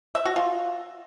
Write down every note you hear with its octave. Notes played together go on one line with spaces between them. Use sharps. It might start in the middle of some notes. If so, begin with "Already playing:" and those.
E5
F#4
F4